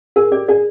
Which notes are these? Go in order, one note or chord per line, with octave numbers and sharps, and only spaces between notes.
G#4 A#4
G4 D5
G#4 D5